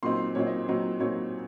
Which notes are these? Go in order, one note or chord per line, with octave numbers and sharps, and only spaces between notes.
A#2 F#3 C4 D#4 C6
A#2 F#3 C4 D#4 C#5
D#5
A#2 F#3 C4 D#4
A#2 F#3 C4 D#4 C#5